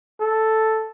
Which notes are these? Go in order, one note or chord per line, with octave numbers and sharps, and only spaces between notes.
A4